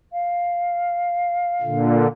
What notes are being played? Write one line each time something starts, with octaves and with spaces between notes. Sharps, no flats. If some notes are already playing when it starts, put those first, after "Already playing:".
F5
A#2 D3